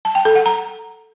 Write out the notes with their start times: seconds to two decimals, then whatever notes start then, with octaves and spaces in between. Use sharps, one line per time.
0.05 A5
0.15 G5
0.25 A4
0.36 F#5
0.46 A#5